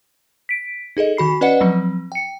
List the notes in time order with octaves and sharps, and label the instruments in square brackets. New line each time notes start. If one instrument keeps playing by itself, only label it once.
[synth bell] B6 D7
D#4 G#4 A4 D#5
D#3 F#4 B5 C7
C#4 B4 D5 D#5 F#5 C#7
F3 F#3 C4
G5 C#7